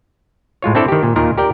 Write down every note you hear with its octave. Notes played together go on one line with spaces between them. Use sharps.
A2 G#3 F4 C#5
C4 D4 E4 A4 C#5 D5
D#3 G4
A#2
D#2 A#2 D#3 F4 A#4
G4 A#4 D5 G5